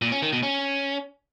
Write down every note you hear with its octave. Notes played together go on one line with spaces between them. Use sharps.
A#2
C#4
D#3
B2
C#4